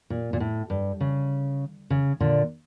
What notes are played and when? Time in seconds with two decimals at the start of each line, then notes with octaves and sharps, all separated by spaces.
0.10 A#2
0.33 A#2
0.40 A2
0.70 G2
1.00 C#3
1.90 C#3
2.20 A#2 D3